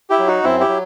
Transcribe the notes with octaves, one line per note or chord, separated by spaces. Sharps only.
E4 G4
F#3
D#4 F#4
F#2 C4 E4
E4 G4
F#3